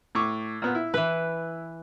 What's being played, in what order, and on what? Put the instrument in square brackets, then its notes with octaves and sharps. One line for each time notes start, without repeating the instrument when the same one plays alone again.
[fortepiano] A2 C#6 D6
A#2 B3
E4
[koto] E3 B4